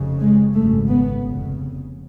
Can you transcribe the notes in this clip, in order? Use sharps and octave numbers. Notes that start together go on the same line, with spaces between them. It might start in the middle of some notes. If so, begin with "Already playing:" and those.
Already playing: F1 F2 C#3
G#3
G#1 F#2 C#3 A3
B3
F1 F2 C#3